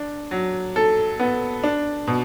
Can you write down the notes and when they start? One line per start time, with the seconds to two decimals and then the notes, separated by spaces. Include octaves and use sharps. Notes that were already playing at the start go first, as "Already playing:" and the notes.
Already playing: D4
0.31 F#3
0.76 A4
1.20 B3
1.64 D4
2.07 B2